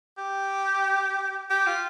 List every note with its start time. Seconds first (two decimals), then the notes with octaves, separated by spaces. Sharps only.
0.17 G4
1.50 G4
1.67 F4